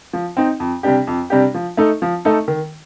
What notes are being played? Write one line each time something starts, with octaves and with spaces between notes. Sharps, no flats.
F3
C4 D#4
F2
C3 G3 D4 G4
F2
C3 G3 D4 G4
F3
A3 D#4 A4
F3
A3 D#4 A4
D#3